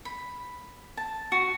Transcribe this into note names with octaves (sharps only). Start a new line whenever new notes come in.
B5
A5
F#4